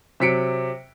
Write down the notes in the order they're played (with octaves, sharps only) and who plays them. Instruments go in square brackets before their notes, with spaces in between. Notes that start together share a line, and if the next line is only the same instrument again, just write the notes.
[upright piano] C3 F#3 B6 C#7 D7